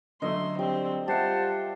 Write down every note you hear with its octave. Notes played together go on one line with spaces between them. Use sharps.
D3 F#3 A3 D#5 C6
G3 C4
G3 F4 G4 C5 E5 F#5 A5